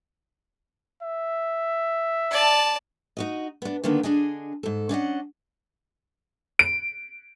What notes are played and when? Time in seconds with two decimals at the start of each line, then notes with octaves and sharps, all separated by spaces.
1.02 E5
2.31 D5 A5
3.17 D#4 F#4 D#5
3.62 B3 D4
3.83 D3 D#3 A#3 B3 D4
4.03 D3 D4 G#4 D#5 G#5
4.63 G#2 A4
4.89 C#4 D4 D#5 F#5
6.59 D7